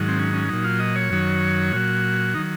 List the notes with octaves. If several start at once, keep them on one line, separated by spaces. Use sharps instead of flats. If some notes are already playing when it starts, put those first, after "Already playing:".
Already playing: G#2 D#3 F#3
C4
C#4
C#4
A#2 F#3 D#4
F4
D#5
C#5
F#2 D#3 F#3
A#2 F#3 F#4
D#3 F#3 D#4